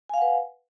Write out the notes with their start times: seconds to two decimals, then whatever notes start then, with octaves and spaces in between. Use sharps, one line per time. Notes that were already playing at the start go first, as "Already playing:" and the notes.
0.09 G#5
0.14 F5
0.18 F#5
0.22 B4